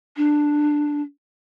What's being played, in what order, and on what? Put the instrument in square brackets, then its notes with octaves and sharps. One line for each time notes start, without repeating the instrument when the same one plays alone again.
[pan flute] D4